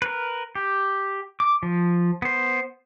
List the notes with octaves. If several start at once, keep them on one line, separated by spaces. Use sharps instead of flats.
A#4 B4
G4
D6
F3
B3 C5